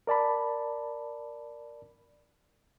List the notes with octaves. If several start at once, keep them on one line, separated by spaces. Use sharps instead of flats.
A#4 D5 A5 B5